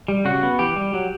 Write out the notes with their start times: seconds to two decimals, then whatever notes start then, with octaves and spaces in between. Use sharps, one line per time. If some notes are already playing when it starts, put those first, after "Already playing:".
0.08 G3
0.25 C#3 F#4
0.43 B3
0.59 E3 G4
0.76 G3
0.94 F#3